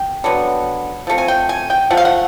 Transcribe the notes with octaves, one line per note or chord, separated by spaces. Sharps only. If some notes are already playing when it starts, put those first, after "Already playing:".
Already playing: G5
D3 F#3 B3
F3 A3 C4
G#5
G5
G#5
G5
F3 A3 F#5
F5
F#5